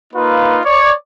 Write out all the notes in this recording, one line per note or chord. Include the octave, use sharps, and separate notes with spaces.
A#3 D#4 F4 B4
C#5 D5